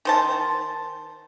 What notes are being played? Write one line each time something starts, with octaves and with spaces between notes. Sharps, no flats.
D#3 C5 A5